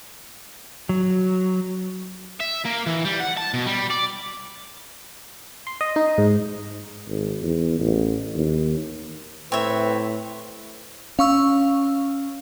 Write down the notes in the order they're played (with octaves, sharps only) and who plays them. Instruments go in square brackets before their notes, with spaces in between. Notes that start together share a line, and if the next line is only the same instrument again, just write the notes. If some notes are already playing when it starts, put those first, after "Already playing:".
[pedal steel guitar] F#3
[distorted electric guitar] E5
A#3
E3
G3
F#5
A5
B2
G3
D5
[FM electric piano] C6
D#5
D#4
G#2
[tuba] G#1
E2
A1
D#2
[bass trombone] A2 [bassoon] C4 [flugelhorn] B4 [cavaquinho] C#5 E5
[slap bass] C#4 [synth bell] F5 C#6 E6